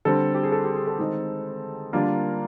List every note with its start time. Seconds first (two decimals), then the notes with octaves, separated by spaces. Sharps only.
0.05 D3 G3 C4 A4
0.34 G4
0.43 G#4
0.52 A4
0.64 G4
0.75 G#4
0.87 A4
0.99 D#3 G#3 C4 D#4
1.93 D3 G3 A#3 D4 F4 A#4